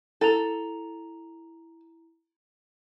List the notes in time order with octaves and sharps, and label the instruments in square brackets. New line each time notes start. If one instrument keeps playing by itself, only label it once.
[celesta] E4 A#5 F7 [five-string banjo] A4